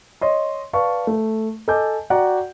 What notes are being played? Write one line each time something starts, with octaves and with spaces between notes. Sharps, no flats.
C#5 D#5 C6
B4 D5 F5 A5 C#6
A3
A4 D#5 G#5 A5 D6 G6
F#4 D5 F#5 G5 A#5